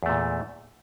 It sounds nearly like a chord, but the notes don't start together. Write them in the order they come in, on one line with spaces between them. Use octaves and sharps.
E2 A3 A#2